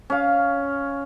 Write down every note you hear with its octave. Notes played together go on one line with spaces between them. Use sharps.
C#4 F5